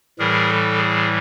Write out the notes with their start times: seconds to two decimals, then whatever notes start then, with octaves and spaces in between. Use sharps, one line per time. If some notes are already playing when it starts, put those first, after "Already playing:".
0.19 A2 E3 G3 G#4 A#4
0.49 A4
0.78 G#4